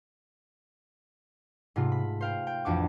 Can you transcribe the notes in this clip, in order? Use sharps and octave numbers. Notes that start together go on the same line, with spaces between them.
G#2 C3 A3 F4
B5
C5 F5 G5
G5
A1 F2 D4 F#4 D6